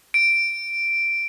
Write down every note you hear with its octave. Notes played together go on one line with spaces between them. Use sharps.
D7